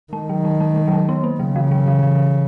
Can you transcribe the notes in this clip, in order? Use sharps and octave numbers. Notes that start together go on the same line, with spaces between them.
D#3 G#3
F#3
G#3
G#3
G#3
F#3
G#3
B3
A#3
C#3 F#3
E3
F#3
E3
E3